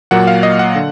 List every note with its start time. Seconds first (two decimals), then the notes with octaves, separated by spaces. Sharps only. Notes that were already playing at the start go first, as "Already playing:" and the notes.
0.11 A#2 F#3 A#3 F#5
0.27 F5
0.43 D#5
0.59 F#5
0.75 D3